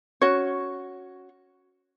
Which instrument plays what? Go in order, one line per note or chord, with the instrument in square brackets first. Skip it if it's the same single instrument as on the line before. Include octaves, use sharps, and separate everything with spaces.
[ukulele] C#4 F#4 C#5